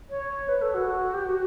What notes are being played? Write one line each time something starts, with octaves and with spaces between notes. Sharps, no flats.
C#5
B4
A4
F#4
G4
F#4